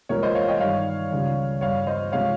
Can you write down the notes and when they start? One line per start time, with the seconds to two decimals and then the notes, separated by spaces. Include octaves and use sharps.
0.09 C2 A#2 F3 G#3 A#4 C#5
0.23 C5 D#5
0.35 C#5 F5
0.48 D#5 G5
0.60 G2 D#3 G3 C#5 F5
1.12 C#2 C#3 G3
1.61 G2 G3 C#5 F5
1.87 C5 D#5
2.12 C3 F3 G#3 C#5 F5